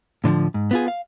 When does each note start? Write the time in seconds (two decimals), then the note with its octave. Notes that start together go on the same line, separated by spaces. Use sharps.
0.24 A2 D3 E3 F3
0.54 G#2
0.71 B3 F4 G#4
0.88 F5